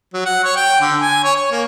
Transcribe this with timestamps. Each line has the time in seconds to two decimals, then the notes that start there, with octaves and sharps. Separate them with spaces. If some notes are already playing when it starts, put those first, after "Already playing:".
0.14 F#3
0.26 F#5
0.44 C#5
0.56 G5
0.81 D3
1.01 G#5
1.24 C#5
1.36 C#5
1.51 A#3